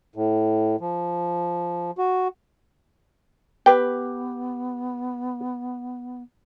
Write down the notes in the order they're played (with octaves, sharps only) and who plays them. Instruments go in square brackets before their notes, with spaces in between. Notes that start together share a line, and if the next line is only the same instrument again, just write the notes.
[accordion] A2
F3
F#4
[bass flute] B3 [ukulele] G4 B4 [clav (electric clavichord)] G5